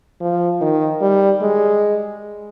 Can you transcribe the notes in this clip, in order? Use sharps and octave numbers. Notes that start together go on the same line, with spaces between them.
F3
D#3
G3
G#3